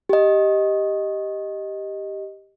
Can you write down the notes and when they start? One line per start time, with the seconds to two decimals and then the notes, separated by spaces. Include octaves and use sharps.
0.09 G4 D#5